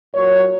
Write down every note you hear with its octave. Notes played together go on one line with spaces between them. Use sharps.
A#2 F#3 C#5